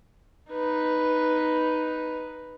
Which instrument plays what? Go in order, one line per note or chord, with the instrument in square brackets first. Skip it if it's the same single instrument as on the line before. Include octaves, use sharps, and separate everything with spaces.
[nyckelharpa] D#4 B4